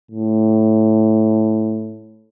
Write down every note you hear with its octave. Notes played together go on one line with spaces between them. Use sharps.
A2